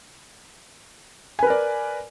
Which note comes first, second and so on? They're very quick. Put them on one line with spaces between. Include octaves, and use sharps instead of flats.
G#5 B4 A#4 D5